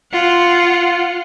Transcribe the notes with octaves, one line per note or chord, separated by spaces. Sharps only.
F4 F#5